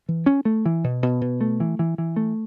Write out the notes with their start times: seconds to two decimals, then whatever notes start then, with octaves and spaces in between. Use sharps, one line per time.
0.09 E3
0.26 C#4
0.45 A3
0.66 E3
0.84 B2
1.03 B2
1.21 B2
1.41 A3
1.60 E3
1.79 E3
1.98 E3
2.16 A3